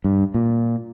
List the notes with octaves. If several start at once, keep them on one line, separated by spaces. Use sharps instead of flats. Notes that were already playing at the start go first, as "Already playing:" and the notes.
G2
A#2